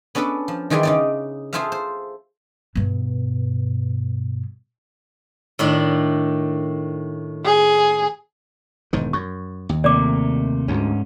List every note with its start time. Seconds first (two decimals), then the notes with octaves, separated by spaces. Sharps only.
0.15 B3 C#4 D4 A4 B4
0.48 F3
0.70 D#3 E3 G3 G#4 D5 C6
0.83 C#3 D#4 D5
1.53 F4 G#4 A4 C5 E5 F5
1.72 C5
2.75 G2 B2
5.59 A2 D#3 D4
7.45 G#4
8.93 E1 G#2 D#3
9.13 F#2 C#6
9.69 D#2
9.84 C3 A3 A#3 D5 D6
10.68 D2 G#2 C#4